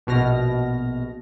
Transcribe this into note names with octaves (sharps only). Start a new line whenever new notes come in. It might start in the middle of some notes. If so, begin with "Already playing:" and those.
A#1 B2 F6 A#6